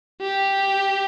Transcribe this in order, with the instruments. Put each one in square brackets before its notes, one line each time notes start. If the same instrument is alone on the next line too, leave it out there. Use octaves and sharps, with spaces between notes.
[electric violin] G4